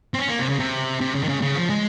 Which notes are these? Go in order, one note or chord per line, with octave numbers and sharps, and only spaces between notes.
C4
C#4
A#3
C3
C#3
C3
C3
C#3
D#3
C#3
C#3
F3
G#3